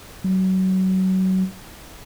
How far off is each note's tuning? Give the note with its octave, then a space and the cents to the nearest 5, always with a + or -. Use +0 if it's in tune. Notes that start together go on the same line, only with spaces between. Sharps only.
F#3 +25